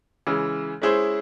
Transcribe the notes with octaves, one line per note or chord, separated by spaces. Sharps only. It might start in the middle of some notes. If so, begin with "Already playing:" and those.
C#3 E3 G#3
G#3 C#4 E4 G#4 C5